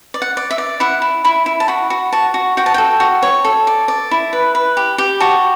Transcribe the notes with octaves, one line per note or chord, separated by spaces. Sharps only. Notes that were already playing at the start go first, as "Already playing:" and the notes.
D5
F#5
D5
E5
D5
E4 F#5
E4
E4 B5
E4
A5
F#4 B5
F#4
F#4 A5
F#4
F#4 G5
A5
A4 G5
F#4
C#5
A4
D5
D5
E4
B4
B4
G4
G4
F#4 A5